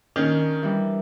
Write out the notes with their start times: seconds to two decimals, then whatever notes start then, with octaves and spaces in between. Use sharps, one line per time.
0.16 D#3 C#4 D4 A#4
0.63 E3 G3